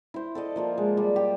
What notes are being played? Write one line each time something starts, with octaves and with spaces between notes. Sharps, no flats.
E4 C5
A4 D5 D#5 A5
F3 A#3 F4
G#3
G3
G4